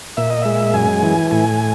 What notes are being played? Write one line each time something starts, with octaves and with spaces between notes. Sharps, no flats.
A#2 E5
D#5
G#3 E5
F#2 G#5
E3
A2 G#5